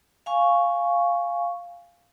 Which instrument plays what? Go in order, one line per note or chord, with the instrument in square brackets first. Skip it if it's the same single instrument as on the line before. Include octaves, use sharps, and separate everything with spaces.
[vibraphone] F5 G#5 C#6